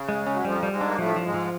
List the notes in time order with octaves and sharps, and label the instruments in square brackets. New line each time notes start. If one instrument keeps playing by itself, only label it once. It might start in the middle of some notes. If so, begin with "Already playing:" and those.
Already playing: [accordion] C#3
[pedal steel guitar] G#3
C#4
[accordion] F#3
[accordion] F2 F3 [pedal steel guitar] G3
[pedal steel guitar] G3
[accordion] G#2 G#3
[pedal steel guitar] D4
[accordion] A#3
[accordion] A2 A3 [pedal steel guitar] F3
[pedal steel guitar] F3
[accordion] G#2 G#3
[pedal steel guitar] F3